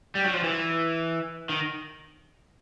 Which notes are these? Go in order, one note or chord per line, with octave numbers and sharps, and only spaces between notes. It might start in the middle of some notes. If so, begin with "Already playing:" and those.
G3
F#3
F3
E3
D#3